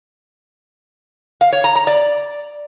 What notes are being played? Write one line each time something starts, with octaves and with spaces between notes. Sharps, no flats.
F5
C#5
A#5
A#5
D5